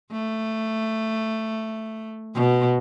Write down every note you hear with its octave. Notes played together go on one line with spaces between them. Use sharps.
A3
B2